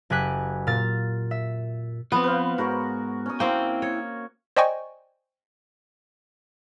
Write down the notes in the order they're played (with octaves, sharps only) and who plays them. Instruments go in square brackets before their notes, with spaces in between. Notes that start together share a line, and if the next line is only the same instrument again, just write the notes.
[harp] F#1 G4 G#5 F#6 B6
A#2 F6 A6
E5
[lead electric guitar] F3 C4 [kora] B3 [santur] B4
[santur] B4 C5 F5
[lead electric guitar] G#2 [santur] F#4 A#4 C#5
[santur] C#4 D#6
[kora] A#3 C4 [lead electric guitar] E4 G5
[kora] C#5
[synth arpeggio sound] C5 D5 D#5 G5 G#5 C#6